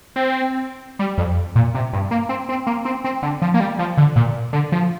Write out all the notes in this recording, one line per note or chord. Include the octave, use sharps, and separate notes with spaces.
C4
G3
F2
A#2
C3
G2
A#3
C4
C4
A#3
C4
C4
D3
F3
A#3
G3
F3
D3
A#2
D3
F3